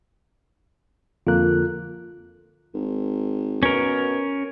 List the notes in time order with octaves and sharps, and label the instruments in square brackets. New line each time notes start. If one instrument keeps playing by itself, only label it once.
[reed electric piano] F2 D3 A#3 [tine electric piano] F4 A4 F#6
[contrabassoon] G#1
[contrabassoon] B2 [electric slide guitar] C#4 A#4